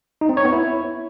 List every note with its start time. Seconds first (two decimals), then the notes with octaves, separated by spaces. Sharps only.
0.21 D#4
0.29 C4
0.37 C#5
0.45 B3
0.53 E4